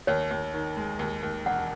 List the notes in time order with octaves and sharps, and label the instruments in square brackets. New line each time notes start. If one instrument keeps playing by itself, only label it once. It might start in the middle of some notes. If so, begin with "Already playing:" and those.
[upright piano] D#2 [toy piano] C#5
[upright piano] D#2
D#3
G#3
D#2
D#2
[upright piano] E1 [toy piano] F#5